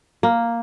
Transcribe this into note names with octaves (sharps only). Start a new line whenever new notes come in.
A#3